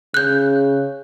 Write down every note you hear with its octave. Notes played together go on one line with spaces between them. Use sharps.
C#3 F#6 G6